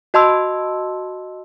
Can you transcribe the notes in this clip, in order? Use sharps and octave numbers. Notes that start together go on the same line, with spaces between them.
F#4 D#5 A5 C6 E6